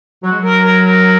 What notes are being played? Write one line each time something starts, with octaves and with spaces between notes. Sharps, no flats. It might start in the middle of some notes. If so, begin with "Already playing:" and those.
F#3 F#4
G#3
F#3 A#4
A#4
A#4